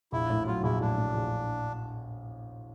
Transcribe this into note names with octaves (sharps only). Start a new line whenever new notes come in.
A#1 E4
A2
F#3 F4
A#1 E4
A2 D4
A2
A#1